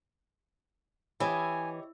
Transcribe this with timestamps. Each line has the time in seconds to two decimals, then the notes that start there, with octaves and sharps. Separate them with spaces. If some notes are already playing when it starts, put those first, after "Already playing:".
1.20 E3 G4 C#5 D#5 G#5